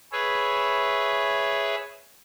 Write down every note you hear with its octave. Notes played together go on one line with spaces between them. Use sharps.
G#4 B4 C#5 E5